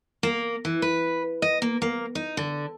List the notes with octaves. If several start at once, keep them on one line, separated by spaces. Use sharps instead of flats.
A#3
E3
B4
D#5
A#3
A#3
D#4
D3